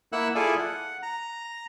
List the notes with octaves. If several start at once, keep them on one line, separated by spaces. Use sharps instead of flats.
A#3 E4 F#5 E6 F#6
E4 F4 G#4 A4 D5 G#5
F#5
A#5